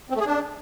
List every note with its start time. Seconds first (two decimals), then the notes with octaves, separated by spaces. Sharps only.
0.10 C4
0.15 A3
0.21 G#4
0.26 D4